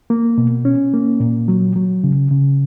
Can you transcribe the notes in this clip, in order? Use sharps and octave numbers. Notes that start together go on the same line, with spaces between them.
A#3
B2
C#4
A#3
A#2
F#3
F#3
C#3
C#3